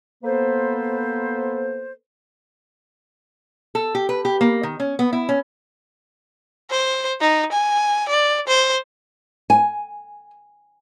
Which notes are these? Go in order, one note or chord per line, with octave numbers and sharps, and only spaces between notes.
A#3 B3 A4 B4 C5
A4
G4
B4
G4
A#3
D#3
C#4
B3
E4
C#4
C5
D#4
G#5
D5
C5
G#5